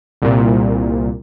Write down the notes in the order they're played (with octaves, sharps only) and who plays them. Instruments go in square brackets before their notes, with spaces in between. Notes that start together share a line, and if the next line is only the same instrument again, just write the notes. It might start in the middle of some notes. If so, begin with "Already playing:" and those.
[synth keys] C2 A#2